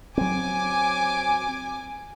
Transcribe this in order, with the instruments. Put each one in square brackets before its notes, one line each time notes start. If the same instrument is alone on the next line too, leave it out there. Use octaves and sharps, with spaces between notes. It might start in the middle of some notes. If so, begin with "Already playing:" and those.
[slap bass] F#3 C4 [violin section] G#5 D6